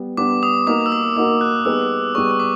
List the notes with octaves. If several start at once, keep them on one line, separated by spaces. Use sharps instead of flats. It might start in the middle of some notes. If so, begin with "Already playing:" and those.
Already playing: G3 B3
G3 B3 D4 D6
D#6
A#3 D#4 F#4 A#4 D6
E6
D#6
A#3 D#4 F#4 A#4 E6
F#6
G3 B3 D#4 G#4 B4 E6
G3 B3 D#4 G#4 B4 C#6
C#6
D6